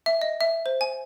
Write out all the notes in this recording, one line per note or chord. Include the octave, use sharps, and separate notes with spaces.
E5
D#5
E5
C5
G#5